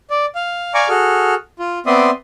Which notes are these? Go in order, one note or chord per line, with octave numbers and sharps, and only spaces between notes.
D5
F5
D5 F5 G#5 A#5 C#6 D6
F#4 G#4 A4 F6
F4
B3 C4 D5 E5 C6 D#6